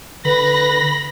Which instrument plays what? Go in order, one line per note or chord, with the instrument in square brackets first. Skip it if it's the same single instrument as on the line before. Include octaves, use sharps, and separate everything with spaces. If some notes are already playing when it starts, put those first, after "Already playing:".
[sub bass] D3 [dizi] B4 [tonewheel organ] B5 [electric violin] A#6